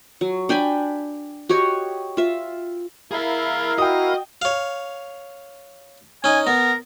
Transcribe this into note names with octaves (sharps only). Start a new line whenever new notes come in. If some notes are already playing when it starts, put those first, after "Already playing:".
F#3
D4 G5 G#5 B5
F#4 G4 C#5 D#5
F4 E5
E4 G#4 A#4 E5 F5
F#4 D#5 G5 D#6
C#5 F5
C#4 D#4 G#5
B3 A#4